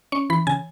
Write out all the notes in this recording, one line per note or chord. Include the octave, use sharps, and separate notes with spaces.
C#4 C#6
E3 B5
C#3 G#5